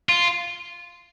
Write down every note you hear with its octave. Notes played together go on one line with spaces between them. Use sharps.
F4